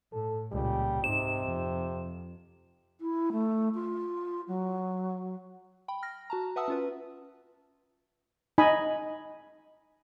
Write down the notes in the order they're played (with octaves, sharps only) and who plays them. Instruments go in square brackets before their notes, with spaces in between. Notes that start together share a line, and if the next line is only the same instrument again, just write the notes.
[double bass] A2 [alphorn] A4
[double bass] C#2 A#2 [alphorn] G3
[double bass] G#2 D#4 [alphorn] C3 [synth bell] E7
[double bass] F2
[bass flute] E4
A3
F4
F#3
[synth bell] G5 B5
F6 A#6
F#4 A5 A#5
B4 E5 F#5 A5 D#6 E6
C#4 F4 B4
[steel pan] D#4 D#5 G#5 B5